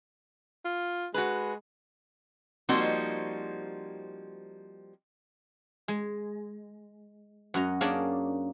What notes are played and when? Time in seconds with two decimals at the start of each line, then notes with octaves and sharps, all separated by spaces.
0.65 F4
1.14 G#3 F#4 B4
2.69 F3 G3 A#3 C4 D#4 F#4
5.88 G#3
7.54 F#2 F#4 D#5 A#5
7.81 A#3 C#4 D4 G#4 D5 D#5